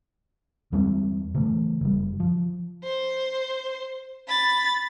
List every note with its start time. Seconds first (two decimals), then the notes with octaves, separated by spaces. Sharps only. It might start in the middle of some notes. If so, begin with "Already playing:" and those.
0.72 E2 G3 G#3 C4
1.34 C#3 E3 A3
1.81 F#1 G3
2.20 F3
2.84 C5
4.28 B5 A6